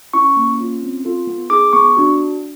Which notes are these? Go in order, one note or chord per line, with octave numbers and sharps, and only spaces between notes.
C#4 E4 C#6
A#3
C#4 F4
C4
F4 A4
B3
D#4 G#4 D6
B3 C#6
D4 F#4